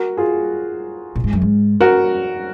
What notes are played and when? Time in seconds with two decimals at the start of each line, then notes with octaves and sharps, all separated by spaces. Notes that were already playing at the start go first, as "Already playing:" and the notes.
Already playing: F#4 A#4
0.17 F4 G#4
1.16 A#2
1.24 G#2
1.33 F#2
1.42 G#2
1.81 F#4 A#4